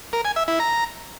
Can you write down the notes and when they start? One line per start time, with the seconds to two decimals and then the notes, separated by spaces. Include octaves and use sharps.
0.13 A#4
0.25 G#5
0.36 E5
0.48 E4
0.60 A#5